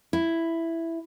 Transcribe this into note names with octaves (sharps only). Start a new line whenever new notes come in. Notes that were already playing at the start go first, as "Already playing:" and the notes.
E4